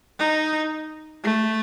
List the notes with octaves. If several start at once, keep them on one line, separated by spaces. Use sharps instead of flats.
D#4
A3